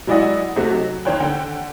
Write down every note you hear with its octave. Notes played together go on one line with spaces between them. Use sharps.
F#3 G#3 E4 D5 D#5 F#5
C3 A3 F#4 G4
F#3 D#4
D#3 C5 C#5 G5 F#6
D3 F#5 G5